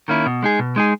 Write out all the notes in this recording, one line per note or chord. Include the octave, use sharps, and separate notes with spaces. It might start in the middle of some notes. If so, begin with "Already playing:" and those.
D#3 A#3 C#4 E4
B2
G#3 D#4 G#4
B2
G#3 D#4 G#4